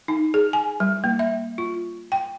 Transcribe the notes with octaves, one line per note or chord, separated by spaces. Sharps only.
D#4
G#4
G#5
G3
A#3
E5
F4
G5